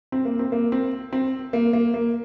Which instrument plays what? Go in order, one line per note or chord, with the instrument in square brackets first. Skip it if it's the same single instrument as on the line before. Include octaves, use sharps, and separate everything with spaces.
[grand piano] C4
A#3
C4
A#3
C4
C4
A#3
A#3
A#3